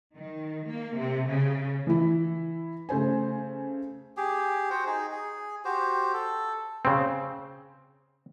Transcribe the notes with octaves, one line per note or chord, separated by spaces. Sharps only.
D#3
A#3
C3
C#3
E3 E4
C#3 A3 C5 G#5
G4 G#4
F#4 C5 F#5 G5
D#4 G#4
G#4
F#4 G4 C5
A4
C#3 C4